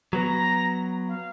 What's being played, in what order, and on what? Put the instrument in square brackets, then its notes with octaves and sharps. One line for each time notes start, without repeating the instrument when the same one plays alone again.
[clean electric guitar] F#3 B3 [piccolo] A#5
[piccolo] F5